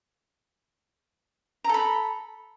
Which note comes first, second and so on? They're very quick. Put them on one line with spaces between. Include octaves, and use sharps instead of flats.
A#5 A4 B5